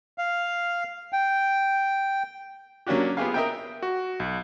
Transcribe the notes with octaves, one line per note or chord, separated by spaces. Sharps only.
F5
G5
F#3 A#3 C#4 D4 F#4 G4
B3 F4 G4 G#4 F5
A#4 D#5 E5 G5
F#4
B1